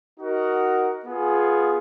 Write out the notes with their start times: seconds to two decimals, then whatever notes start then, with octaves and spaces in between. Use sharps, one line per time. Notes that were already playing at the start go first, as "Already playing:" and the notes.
0.19 D#4 F#4 A#4 D#5 F#5
1.06 B3 F4 G#4